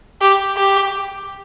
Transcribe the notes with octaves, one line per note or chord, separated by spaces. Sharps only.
G4
G4